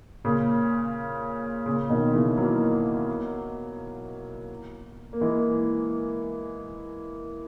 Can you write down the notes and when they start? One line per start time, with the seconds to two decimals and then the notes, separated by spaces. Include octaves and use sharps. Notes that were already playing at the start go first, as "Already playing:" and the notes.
0.25 A#2 C#3
1.66 A#2 C#3
1.90 B2 D#3
2.14 C#3 E3
2.37 F#3 A#3
5.13 A#3
5.21 E3 G#3